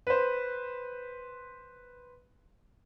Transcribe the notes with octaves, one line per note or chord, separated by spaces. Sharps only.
B4 C5